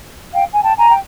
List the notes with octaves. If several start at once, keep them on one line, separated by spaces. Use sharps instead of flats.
F5 G5
G#5
G5 A5
G#5 A#5
G5